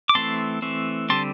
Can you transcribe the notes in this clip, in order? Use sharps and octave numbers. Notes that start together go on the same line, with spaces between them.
D6
E3 A3 C4 A5 C6
E3 A3 C4
D3 G3 C4 A5 C6